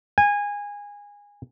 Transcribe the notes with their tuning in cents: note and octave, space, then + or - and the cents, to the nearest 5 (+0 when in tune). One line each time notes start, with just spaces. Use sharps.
G#5 -20